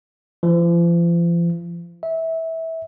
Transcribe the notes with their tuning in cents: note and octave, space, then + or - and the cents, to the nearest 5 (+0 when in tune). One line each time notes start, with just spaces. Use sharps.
F3 -40
E5 -20